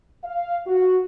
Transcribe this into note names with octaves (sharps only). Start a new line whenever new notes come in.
F5
F#4